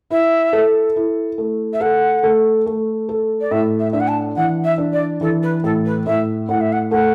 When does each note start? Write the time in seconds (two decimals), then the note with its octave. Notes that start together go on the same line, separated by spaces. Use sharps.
0.10 E4 E5
0.53 A4
0.96 E4
1.38 A3
1.73 E5
1.81 A4 F#5
2.23 A3
2.66 A3
3.09 A4
3.41 D5
3.51 A2 E5
3.79 E5
3.92 D4 E5
4.00 F#5
4.08 A5
4.36 E3 F#5
4.64 E5
4.78 D4
4.93 D5
5.21 E3 A4
5.43 B4
5.64 A2 A4
5.85 B4
6.06 A2 E5
6.49 A2 F#5
6.60 E5
6.72 F#5
6.91 A3 F#5